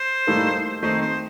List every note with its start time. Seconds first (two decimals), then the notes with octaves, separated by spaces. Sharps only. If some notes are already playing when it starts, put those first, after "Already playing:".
Already playing: C5
0.27 A2 G3 A#3 D#4 A4
0.82 D#3 A3 C4 D#4 C5
1.02 C5